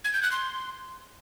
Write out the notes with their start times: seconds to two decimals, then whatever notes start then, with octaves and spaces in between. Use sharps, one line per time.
0.04 G#6
0.13 G6
0.23 F#6
0.32 C6